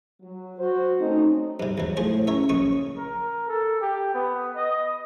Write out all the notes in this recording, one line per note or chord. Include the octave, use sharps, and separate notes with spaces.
F#3
F#4 C5
A3 C4 C#4 D#4
G2 C3
E2 F#3
A2 F3 G#4 C5
C#3 A#4 C#5 E5
A#1 C#6 D#6
A#4
A4
G4
B3
D#5